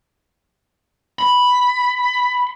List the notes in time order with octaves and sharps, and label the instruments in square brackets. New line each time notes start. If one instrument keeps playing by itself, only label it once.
[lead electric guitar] B5